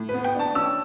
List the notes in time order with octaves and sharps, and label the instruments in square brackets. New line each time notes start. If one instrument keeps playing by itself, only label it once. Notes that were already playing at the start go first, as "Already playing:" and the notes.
Already playing: [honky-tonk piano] A2
B3 B4
G5
D4 A5
C#4 E6